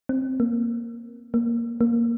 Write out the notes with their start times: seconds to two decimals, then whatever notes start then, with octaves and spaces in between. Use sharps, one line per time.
0.09 C4
0.40 A#3
1.34 A#3
1.81 A#3